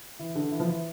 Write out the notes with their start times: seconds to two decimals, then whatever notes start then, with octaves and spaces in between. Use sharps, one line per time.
0.19 E3
0.35 D3
0.51 E3
0.60 F3
0.68 E3